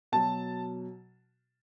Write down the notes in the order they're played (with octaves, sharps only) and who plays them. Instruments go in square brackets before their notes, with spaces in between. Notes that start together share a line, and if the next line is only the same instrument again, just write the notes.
[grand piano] B2 F#3 A5